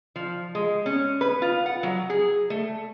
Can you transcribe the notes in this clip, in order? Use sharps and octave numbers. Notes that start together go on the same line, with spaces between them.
F3
G#3
C#4
B4
F4
F#5
F#3
G#4
A3